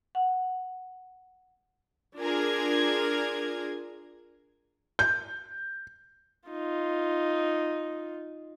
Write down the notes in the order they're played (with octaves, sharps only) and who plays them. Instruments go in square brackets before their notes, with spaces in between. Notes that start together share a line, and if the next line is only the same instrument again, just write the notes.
[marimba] F#5
[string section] D4 F4 G#4 A#4 G#6
[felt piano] G6
[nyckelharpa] D#4 F4